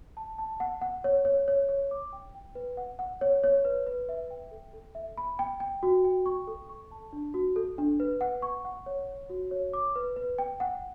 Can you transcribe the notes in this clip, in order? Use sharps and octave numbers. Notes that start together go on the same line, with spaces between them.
A5
A5
F#5
F#5
C#5
C#5
C#5
C#5
D6
G5
G5
B4
F#5
F#5
C#5
C#5
B4
B4
E5
G5
A4
A4
E5
B5
G5
G5
F#4
G5
C#6
A4
C#6
A5
D4
F#4
A4
D4
B4
F#5
C#6
F#5
C#5
C#5
F#4
C#5
D6
B4
B4
G5
F#5